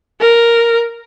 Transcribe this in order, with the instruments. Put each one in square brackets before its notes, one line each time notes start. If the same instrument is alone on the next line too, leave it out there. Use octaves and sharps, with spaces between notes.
[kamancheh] A#4